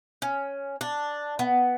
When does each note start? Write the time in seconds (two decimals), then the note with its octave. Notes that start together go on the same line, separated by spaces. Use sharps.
0.22 C#4
0.81 D4
1.39 B3